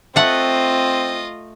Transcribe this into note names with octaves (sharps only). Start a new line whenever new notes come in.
A3 C4 F4 D#5 F#5